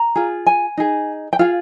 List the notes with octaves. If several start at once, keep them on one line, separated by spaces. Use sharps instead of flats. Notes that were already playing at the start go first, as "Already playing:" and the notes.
Already playing: A#5
F4 G#4
G#5
D#4 G#4
G5
F4 G#4 F5